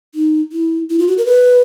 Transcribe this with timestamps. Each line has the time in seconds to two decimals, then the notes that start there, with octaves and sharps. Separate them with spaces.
0.15 D#4
0.52 E4
0.90 E4
0.99 F4
1.07 F#4
1.18 A#4
1.26 B4